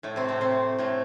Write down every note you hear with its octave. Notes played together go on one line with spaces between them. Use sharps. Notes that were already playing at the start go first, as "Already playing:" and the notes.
A2 A3
C3 C4
A2 A3
C3 C4
A2 A3